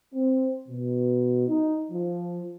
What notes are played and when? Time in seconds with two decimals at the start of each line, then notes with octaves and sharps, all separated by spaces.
0.14 C4
0.69 B2
1.49 D#4
1.92 F3